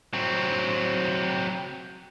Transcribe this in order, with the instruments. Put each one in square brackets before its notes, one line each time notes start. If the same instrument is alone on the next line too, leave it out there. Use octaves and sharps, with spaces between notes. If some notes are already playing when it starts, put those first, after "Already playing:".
[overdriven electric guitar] F#3 C4